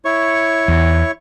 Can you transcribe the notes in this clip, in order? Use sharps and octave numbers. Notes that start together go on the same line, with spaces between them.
E4 C#5 C#6
E2